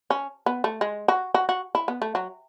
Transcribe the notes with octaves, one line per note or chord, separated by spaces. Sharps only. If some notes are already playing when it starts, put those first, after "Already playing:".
C#4
B3
A3
G#3
F#4
F#4
F#4
E4
B3
A3
F#3